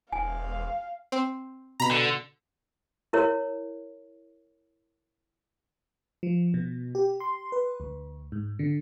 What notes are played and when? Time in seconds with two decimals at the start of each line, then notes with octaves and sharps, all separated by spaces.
0.12 E1 F5 G#5
1.12 C4
1.80 B2 A#5 B5
1.91 D3
3.13 E4 A#4 C#5
6.23 F3
6.54 B2
6.95 G4
7.20 C6
7.52 B4
7.80 D2
8.32 G#2
8.59 D3